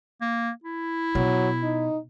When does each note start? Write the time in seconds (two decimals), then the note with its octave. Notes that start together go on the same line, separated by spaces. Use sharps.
0.21 A#3
0.64 E4
1.15 B2 F#3
1.63 D#4